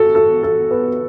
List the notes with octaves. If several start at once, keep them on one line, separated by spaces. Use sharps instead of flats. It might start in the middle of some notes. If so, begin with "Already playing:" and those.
Already playing: F#4 A4
A4
A4
B3